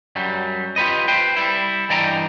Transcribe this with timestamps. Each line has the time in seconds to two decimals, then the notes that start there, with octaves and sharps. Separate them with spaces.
0.16 F#2 F#3 G3
0.76 F4 G4 B4 D#5
1.08 B4 C5 G5
1.37 G3 E4
1.89 G2 E3 D5 D#5 G5 A#5